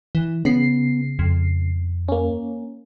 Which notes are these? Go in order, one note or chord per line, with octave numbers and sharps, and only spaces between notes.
E3
C#3 B3 C7
F2
A#3 C#4